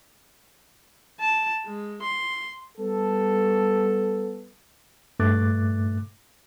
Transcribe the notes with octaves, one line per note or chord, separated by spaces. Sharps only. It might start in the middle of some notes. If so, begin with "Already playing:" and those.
A5
G#3
C6
G3 B3 A4
G2 A#2 A3 D6 F#6 A6